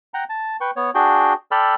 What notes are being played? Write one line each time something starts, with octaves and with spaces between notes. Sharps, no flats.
F#5 G5 A#5
A5
B4 G5 C#6
B3 C#5
D4 F#4 G#4 G5
A4 D5 G5 B5 E6 F6